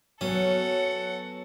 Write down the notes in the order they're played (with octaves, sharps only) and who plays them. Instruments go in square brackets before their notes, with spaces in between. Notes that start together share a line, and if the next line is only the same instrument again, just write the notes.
[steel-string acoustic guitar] F#3 B3 [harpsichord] C#4 [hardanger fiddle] A4 F#5 [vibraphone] C#5